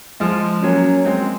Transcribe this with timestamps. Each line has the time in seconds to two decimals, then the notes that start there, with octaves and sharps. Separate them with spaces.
0.20 F3 G#3
0.63 F#3 A#3 C#4
1.05 G#3 C4